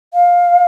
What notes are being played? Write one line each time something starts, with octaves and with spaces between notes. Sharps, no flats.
F5